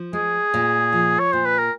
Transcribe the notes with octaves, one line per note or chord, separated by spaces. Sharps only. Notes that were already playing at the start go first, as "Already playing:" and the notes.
Already playing: F3
G#3 G#4
A#2
F3
C#5
A#2 C5
B4
A#4